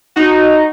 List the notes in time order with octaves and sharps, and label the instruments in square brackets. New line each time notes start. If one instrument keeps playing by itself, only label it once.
[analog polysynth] D#4 F#4